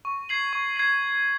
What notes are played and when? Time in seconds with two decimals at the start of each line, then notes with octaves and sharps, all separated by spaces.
0.05 C#6
0.29 G#6 C7 F#7
0.53 C#6
0.76 G#6 C7 F#7